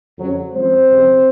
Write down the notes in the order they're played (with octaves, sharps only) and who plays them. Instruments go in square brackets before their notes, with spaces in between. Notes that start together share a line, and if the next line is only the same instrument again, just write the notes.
[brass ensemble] F2 C#3 F#3
F#2 F3 G#3 C4 C5
C#2 C3 F3 G#3